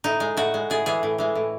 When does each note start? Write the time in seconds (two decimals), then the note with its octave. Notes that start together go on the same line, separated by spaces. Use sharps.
0.04 A2 D#4
0.20 G#3
0.37 A2 F#4
0.54 G#3
0.70 A2 G#4
0.86 E3 G#3 G#4
1.03 A2
1.18 E3 G#3
1.36 A2